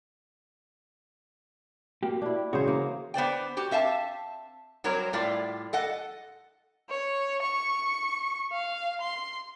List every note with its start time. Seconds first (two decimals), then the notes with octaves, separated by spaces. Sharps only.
2.03 A#3 F#4 G4
2.22 D4 E4
2.53 C#3 E3 C#4 F#4 C5
2.68 A#3
3.14 B3 C5 D5 G5
3.57 F#4 G4
3.71 C4 E5 F5 A5
4.84 F#3 G3 C4 A#4 C#5
5.13 A2 G3 F4 D5
5.73 A4 D#5 F#5
6.90 C#5
7.42 C#6
8.52 F5
9.01 C6